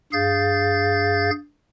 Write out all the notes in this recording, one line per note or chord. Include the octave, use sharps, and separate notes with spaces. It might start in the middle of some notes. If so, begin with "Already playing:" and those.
G2 G#4 F5 G6 A6